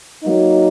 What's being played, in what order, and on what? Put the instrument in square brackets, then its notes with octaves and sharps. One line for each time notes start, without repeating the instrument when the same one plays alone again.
[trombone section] F#3 A#3 D#4